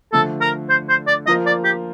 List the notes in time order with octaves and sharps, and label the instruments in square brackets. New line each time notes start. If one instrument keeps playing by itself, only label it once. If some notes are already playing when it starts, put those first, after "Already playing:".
[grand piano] D3 F3 A3 [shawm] A4
[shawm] A#4
C5
C5
D5
[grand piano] F3 A#3 F4 A#4 [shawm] D#5
[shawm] D5
G4